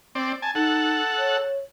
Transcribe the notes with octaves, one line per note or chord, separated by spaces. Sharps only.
C4 D5
G#5 A5
D#4 A4 F#5
C#5